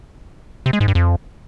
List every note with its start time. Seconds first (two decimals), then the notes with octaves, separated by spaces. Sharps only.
0.66 C3
0.73 G#3
0.81 G#2
0.88 G2
0.95 F2